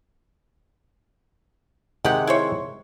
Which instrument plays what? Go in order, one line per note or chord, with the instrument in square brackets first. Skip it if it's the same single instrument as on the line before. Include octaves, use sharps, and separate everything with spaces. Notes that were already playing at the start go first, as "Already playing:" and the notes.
[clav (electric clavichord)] C3 D#3 G#3 [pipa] G4 F#5
[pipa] E4 C5 C#5